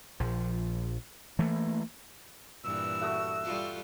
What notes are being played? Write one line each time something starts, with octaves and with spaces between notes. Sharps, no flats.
A#1 F3
E3 A3 A#3
G2 A#2 E3 E6
A3 F#4 D#6
G3 F4 A4